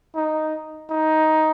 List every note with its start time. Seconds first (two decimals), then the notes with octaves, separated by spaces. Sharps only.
0.15 D#4
0.90 D#4